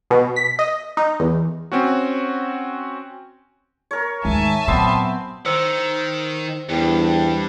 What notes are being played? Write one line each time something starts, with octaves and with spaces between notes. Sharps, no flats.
B2
B6
D#5
D#4
E2
C4 C#4 F#4
A#4 C#5
D#2 G#2 E5 G#5 A5
A#2 F#3 B3 C4 C6
D#3 C5 E6 C#7
E2 G2